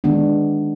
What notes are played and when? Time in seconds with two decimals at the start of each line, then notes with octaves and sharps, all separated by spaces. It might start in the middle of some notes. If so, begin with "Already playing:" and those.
0.04 D#3 G#3 B3 D4